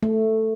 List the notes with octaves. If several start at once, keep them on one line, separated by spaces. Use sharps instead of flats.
A3